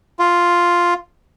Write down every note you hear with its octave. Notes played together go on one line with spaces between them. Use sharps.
F4